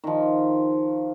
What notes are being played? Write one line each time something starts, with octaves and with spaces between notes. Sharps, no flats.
D#3 F3